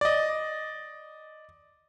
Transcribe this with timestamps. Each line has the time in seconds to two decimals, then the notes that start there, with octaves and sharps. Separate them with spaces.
0.01 D5 D#5